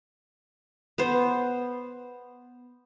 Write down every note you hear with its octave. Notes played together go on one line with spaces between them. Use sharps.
B3 C5